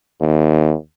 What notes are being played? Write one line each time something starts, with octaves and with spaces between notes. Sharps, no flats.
D#2